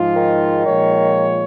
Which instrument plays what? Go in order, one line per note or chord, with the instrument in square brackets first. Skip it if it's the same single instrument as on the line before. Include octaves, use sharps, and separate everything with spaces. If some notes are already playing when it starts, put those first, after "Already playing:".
Already playing: [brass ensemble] G#2 F3 G#3 F4
[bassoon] D#3
[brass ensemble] A#2 F3 G#3 F4 C#5